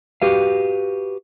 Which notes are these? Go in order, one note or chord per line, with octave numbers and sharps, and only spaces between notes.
F#4 G4 B4 F5